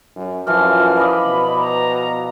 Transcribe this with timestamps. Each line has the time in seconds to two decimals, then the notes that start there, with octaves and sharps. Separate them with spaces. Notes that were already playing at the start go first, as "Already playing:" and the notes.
0.15 F#2
0.47 F#2 E3 F3 F6
0.97 D5 D#5 F5 B5
1.27 B2
1.59 A#5